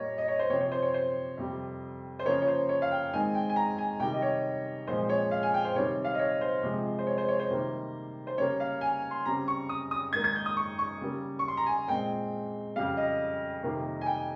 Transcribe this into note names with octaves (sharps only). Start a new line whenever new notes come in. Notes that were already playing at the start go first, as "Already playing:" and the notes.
Already playing: A#2 G3 A#3 C#5 D#5
D#5
C#5
C5
C3 F3 C4 C#5
C#5
C5
C#5
C5
F2 C3 G3
C5
C#3 F3 A#3 C#5
C#5
C5
C#5
F5
G5
G#2 D#3 G#3 C4 G#5
G5
G#5
A#5
G#5
C3 D#3 G3 G5
D#5
C#5
A#2 F3 G#3 C4 C5
C#5
F5
G#5
G5
C5
C3 D#3 G3 C4 C#5
F5
D#5
C#5
C5
C3 F3 G#3 C4
C5
C#5
C5
C#5
C5
C3 D#3 G3 A#3
C5
C#3 G3 A#3 C#5
F5
G#5
C6
C#3 G3 C4 A#5
C#6
D#6
D#6
G#2 D#3 A#3 G#6
G#6
G6
D#6
C#6
C#6
C#3 G3 A#3
C#6
C6
A#5
G#5
A#2 G#3 C4 G5
F2 C#3 G3 F5
D#5
F2 C3 D#3 G3 A#3
G#5
G5